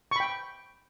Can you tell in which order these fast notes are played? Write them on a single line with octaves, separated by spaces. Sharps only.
C#6 B5 G5